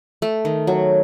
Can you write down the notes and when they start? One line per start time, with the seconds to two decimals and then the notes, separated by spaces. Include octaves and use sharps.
0.22 A3
0.45 D#3
0.67 F#3